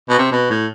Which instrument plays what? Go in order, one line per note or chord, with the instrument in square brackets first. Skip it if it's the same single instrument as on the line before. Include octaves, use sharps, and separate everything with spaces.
[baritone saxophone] B2
C3
B2
A2